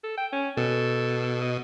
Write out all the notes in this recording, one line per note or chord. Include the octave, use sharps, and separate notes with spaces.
A4
G5
C#4
B2 A4
D#5